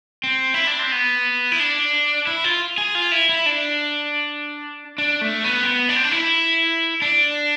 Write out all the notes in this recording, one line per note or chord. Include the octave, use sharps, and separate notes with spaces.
C4
E4
D4
C4
B3
E4
D4
E4
F4
G#4
F4
E4
E4
D4
D4
A3
B3
C4
B3
D4
C4
D4
E4
D4